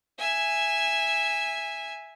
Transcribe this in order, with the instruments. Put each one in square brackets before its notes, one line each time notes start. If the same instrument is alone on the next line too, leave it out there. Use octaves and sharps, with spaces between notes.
[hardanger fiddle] E5 G#5